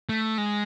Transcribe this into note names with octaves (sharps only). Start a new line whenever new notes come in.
A3
G#3